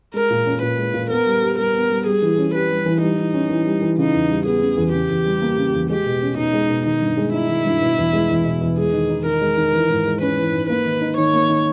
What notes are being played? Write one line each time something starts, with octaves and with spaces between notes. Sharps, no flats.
G#3 A#4
A#2
C#4
A#2 B4
G#3
A#2
B3 A#4
G3
G4
G3 A#4
B3
G3
G3 G#4
E3
C#4
G4 B4
G3
E3
G3 D#4
E3
C#4
E3
G3
E3
C#3 D#4
E2
G3
B3 G#4
C#3
E2
C#3 G4
E2
G3
A#3
C#3
E2
G#3 G4
B2
C#4
B2 D#4
G#3
B2
D#3 D#4
G2
G#3
D#4 E4
D#3
G2
B2
E2
G#3
E2
B2
E2
G#3 G#4
D#3
D#4
D#3 A#4
G#3
D#3
E3
G#2
G#3
C#4 B4
E3
G#2
A#3 B4
D#3
D#4
D#3 C#5
A#3
D#3